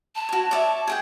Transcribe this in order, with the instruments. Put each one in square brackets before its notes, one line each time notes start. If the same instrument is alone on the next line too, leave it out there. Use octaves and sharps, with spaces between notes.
[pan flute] A5
[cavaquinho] F#4 C#5
C#5 D5 E5
G#4 F#5 G5